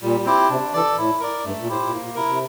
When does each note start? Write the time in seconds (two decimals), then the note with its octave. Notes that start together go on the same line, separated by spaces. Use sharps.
0.02 A#2 G3
0.25 C4 E4 G4
0.49 C3 D4
0.73 E3 D5
0.77 A4
0.96 A2 E4
1.20 A#4 D5
1.44 G2 A3
1.60 A#2
1.69 A2 E4 G4 C5
1.84 A#2
1.92 A2 A#3
2.04 A#2
2.15 C3 E4 A#4
2.27 C3